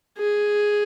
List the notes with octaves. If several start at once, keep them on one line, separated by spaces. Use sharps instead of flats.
G#4